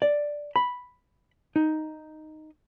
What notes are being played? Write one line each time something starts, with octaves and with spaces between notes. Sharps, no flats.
D5
B5
D#4